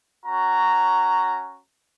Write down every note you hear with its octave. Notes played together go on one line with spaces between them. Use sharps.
C#4 F#4 A#5